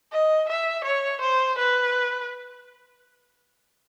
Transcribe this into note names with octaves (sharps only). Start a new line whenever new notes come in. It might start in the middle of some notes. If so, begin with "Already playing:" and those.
D#5
E5
C#5
C5
B4